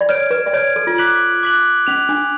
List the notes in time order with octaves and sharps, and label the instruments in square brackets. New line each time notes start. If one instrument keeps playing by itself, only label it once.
[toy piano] D5
[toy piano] C#5 [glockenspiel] F6 G#6 D7
[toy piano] B4
D5
[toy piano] C#5 [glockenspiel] F6 G#6 D7
[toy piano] A4
F4
[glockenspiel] D6 F#6 B6 F#7
D6 F#6 B6 F#7
[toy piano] C#4 [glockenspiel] F#6 B6 F7
[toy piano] D4